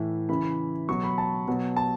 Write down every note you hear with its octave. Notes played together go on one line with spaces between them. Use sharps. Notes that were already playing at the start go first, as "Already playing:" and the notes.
Already playing: A2 E3
C#3 E3 B5
B2 F#3 C#6
B5
A5
B2 F#3
A5